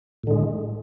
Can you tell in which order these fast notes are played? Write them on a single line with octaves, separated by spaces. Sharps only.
A2 D3 G#3